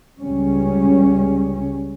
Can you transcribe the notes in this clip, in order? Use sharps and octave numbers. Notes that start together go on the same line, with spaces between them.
C#2 C#3 G3 C#4